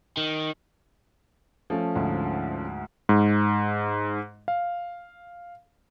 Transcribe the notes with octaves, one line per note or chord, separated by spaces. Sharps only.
D#3
F3 A3 C#4
D2 G#2
G#2
F5